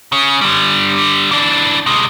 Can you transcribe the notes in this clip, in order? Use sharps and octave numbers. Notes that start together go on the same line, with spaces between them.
C#3 C#4
D3 G3
E3 D4
C3 G#3